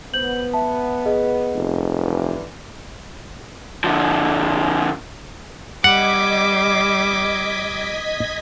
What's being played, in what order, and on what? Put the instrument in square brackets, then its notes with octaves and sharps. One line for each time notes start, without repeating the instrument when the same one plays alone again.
[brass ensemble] B3 [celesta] C5 G6 F#7
[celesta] E5 A5
G#4 B4 D#5
[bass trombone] F1
[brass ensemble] G2 D3 E3
[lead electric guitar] D3 F3
[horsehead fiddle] G3 [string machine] D#5 G#6 B6 [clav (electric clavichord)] F#5 [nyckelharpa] D6